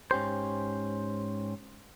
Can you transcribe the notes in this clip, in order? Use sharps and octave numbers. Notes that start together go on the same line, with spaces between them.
G#2 C#4 G4 C5